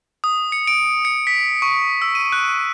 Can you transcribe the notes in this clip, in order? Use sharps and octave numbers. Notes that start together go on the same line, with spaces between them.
D#6
C#7
D7
C#7
B6
C#6
E6
D#7
F#6